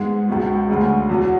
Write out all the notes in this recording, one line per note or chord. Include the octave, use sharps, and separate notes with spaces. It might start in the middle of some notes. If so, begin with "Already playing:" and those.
Already playing: G#2 G#3 B3
C#2 B2 G#3 B3 F#4
D2 C#3 G#3 B3
E2 B2 F#3 B3 F#4